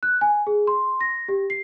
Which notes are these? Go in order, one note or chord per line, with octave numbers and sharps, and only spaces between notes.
F#6
G#5
G#4
C6
A#6
G4
C7